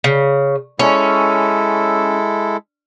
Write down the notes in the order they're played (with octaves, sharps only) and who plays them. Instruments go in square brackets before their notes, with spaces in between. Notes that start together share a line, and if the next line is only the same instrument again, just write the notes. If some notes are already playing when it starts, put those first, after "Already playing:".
[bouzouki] C#3
[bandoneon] G#3 E4 A4 [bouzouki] C#4